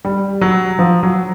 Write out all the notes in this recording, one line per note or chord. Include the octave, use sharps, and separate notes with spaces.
G3
F#3
F3
F#3